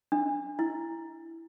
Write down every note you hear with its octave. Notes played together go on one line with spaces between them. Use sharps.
D4
E4